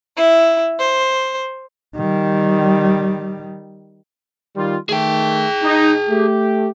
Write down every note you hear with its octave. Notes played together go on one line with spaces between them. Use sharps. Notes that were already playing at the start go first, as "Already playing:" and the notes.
E4
C5
D#3 G3
D#3 G3 F4
D#3 A3 G#4 G5
D#4
A3 G4